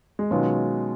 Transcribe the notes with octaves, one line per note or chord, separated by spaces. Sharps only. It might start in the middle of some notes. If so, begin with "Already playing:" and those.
G#3
B2 D#3 F#3 G#3 C#4 F4 B4